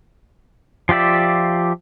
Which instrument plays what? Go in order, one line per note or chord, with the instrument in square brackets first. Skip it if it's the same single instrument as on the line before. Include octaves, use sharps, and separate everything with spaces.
[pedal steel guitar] F3 F4 G4 D5 E5